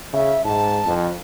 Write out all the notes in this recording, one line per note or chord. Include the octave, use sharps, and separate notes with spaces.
C#3 E5
G#2 A5
F2